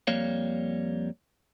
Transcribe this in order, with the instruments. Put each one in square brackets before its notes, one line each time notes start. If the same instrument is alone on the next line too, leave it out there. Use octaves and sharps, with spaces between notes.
[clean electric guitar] F2 G3 A#3 C#5 F5